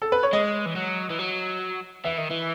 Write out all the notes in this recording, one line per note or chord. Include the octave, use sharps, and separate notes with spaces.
A4
B4
C#5
G#3 D#5
E3
F#3
E3
F#3
E3 E5
D#3
E3